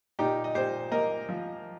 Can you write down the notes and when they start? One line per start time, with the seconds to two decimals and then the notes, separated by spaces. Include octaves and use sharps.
0.19 A#2 D#4 G4
0.44 D#5
0.55 A#2 G4 C5
0.92 A#3 A#4 D#5
1.29 F3